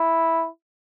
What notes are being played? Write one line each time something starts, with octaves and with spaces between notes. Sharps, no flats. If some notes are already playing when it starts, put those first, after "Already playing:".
Already playing: E4